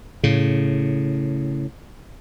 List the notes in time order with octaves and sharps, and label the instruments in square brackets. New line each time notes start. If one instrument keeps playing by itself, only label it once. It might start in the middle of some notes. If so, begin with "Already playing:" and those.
[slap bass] A2 C#3